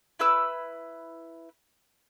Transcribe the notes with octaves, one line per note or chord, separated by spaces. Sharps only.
E4 B4 E6